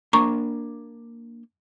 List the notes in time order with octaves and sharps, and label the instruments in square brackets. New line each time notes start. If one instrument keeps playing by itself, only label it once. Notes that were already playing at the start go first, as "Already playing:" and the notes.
[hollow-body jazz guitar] A#3 D4 C6 [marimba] A#5 C#6